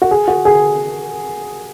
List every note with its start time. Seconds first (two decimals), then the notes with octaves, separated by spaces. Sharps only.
0.02 F#4
0.11 G#4
0.28 F#4
0.45 G#4